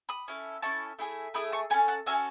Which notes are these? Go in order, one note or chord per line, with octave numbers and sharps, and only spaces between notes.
B5 D#6
C#4 E4 A4
C#4 E4 A4 A5 C#6
A3 E4 G#4
A3 E4 G#4 B5 D#6
A5 C#6
C#4 F#4 A4 G#5 B5
F#5 A5
C#4 F#4 A4 E5 G#5